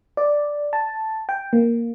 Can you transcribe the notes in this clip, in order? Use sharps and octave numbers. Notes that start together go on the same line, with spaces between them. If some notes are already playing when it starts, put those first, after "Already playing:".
D5
A5
G5
A#3